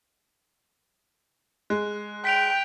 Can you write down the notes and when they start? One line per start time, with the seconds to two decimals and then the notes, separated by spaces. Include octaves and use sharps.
1.70 G#3 F#6
2.25 G5 B6 D7 F7